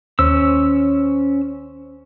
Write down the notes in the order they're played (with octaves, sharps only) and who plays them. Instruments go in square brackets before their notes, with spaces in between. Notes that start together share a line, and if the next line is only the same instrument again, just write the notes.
[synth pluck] D#2 C5 [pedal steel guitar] C#4 E6